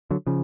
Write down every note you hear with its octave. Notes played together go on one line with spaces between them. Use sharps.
D3 F#3
C#3 F3